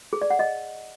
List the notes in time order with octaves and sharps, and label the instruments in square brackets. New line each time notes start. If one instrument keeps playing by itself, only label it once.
[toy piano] G#4
D5
F#5
D#5